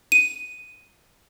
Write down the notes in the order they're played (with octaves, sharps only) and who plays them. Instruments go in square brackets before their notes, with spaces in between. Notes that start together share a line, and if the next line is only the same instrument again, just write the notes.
[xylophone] D#7